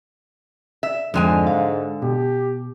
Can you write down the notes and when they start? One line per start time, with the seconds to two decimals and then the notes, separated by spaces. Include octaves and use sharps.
0.83 E5
1.14 F2 G#2 D3 G#3 G#5
1.47 F5
2.02 B2 G4